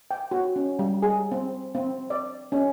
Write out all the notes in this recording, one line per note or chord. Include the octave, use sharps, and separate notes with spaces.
G5
F#4
C#4
G3
G#4
C4
C4
D5
C#4